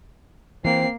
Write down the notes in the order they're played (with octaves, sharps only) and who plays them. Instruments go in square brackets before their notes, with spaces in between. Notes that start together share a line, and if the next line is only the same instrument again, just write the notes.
[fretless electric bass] E3 [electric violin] A#3 C7 [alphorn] C4